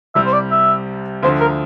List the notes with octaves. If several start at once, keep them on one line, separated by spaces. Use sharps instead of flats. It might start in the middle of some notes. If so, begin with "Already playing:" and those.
C2 C3 G3 E5
C5
D5
E5
D2 D3 F3 C5
A#4